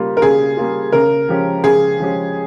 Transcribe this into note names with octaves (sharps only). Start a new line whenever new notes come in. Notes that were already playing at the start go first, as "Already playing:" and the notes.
Already playing: C#3 G3 A#3 F4
A#4
C#3 G#4
G3 A#3 F4
C#3 A#4
F3 G#3 C#4 G4
C#3 G#4
F3 G#3 C#4 G4